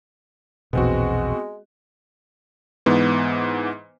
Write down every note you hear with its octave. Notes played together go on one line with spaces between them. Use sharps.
A#1 E2 B2 G#3 B3 C4 F#4
G#2 E3 B3